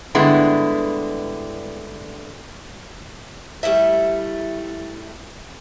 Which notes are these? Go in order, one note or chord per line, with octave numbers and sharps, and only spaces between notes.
G2 D3 G#3 B3 E4
G3 A3 E4 E5